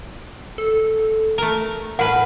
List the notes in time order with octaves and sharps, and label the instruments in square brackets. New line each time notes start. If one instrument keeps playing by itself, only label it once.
[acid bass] A4
[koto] A3 A#4
[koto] A2 B4 [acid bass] A#4 [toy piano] F#5